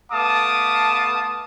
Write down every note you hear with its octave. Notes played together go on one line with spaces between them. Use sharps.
A3 B3 F5 A5 D6 D#6